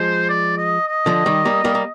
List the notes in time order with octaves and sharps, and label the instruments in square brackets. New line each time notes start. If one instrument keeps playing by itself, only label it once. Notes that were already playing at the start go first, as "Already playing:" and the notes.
Already playing: [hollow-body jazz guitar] F3 G#3 [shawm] C5
[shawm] D5
D#5
D#5
[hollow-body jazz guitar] D3 F3
D#3 G3
G3 A#3
G3 A#3
A#3